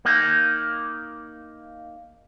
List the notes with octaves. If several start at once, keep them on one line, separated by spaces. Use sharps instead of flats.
A#3 D#4